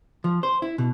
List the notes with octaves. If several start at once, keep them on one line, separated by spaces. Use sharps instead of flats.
F3
C5
E4
B2